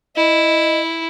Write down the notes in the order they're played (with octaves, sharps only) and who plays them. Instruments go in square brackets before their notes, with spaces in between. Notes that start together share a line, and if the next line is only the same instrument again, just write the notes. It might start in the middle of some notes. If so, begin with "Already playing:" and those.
[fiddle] E4 [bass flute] D#5